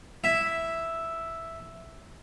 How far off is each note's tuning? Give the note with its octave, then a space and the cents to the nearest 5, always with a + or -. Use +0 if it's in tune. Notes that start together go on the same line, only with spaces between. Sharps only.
E4 +0 E5 +0